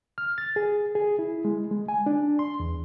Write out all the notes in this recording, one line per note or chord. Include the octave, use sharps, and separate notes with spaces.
F6
A6
G#4
G#4
E4
G#3
G#3
G#5
D4
C6
E2